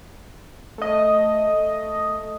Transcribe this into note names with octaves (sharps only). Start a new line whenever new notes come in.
A3 D#5